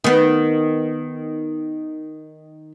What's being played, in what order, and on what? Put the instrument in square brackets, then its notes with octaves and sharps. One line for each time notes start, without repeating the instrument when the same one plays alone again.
[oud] D#3 B3